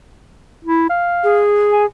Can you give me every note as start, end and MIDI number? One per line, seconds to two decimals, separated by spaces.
0.65 0.86 64
0.90 1.41 77
1.24 1.86 68
1.72 1.84 80